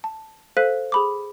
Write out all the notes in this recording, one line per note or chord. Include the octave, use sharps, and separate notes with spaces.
A5
A4 C5 F5 F#6 B6 D#7
G#4 B5 D6